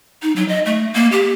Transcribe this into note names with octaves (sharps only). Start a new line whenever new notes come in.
D#4
F#3
D#5
A3
A#3
G4